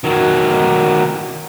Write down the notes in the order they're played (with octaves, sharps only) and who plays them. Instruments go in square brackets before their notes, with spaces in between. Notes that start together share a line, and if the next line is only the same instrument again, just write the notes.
[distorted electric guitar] D#3 F#3